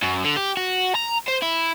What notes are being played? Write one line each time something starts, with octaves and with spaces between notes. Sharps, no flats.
F#2
D3
G4
F#4
A#5
C5
E4